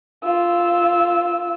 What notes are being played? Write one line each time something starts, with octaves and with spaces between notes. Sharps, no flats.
F4 E6